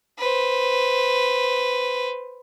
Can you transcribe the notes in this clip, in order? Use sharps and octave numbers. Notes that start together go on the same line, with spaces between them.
B4 C5